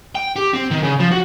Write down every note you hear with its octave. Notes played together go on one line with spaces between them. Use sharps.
G5
G4
C4
D#3
C#3
F3
F#4